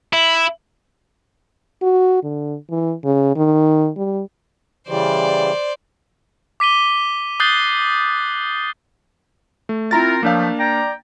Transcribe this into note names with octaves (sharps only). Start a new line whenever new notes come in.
E4
F#4
D3
E3
C#3
D#3
G3
C#3 E3 G3 C5 D5
D6 B6 D#7 G7
D#6 F#6 G6 A6 C7 G7
A3
C4 E4 F4 A#4 A#5 A6
F3 F#3 A3 A#3 D4 F5
D5 G5 A#5